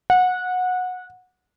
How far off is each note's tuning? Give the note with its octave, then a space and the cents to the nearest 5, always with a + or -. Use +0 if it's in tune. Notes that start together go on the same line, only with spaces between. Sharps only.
F#5 -20